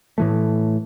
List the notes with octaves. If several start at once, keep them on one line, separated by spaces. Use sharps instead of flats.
A2 E3 A3